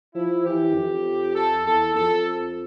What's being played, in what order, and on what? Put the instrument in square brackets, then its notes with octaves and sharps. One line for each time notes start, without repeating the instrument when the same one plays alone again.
[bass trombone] F3 [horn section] E4
[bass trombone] E3 [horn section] G4
[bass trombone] F2
[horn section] A4
[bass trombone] E2 [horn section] A4
[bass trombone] F2 [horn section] A4